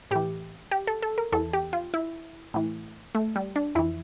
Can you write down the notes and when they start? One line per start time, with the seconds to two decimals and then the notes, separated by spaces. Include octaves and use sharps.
0.11 A2 E3 G4
0.71 G4
0.87 A4
1.02 A4
1.18 A#4
1.32 E2 E3 A4
1.53 G4
1.73 F4
1.94 E4
2.54 A2 E3
3.15 A3
3.36 G3
3.56 D4
3.75 F2 E3 E4